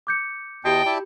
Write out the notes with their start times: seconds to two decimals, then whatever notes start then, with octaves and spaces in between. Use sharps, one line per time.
0.07 D6 G6 C#7
0.65 E2 F#4 G4 D#5 G5 A5 B5
0.86 E4 D5 A5